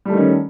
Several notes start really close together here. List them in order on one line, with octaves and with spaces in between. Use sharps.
G3 A3 D#3 C#4